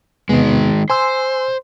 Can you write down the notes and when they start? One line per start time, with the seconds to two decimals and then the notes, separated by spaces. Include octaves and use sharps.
0.29 E2 C3 D#3 G#3 B3
0.90 C5 G#5 C6 E6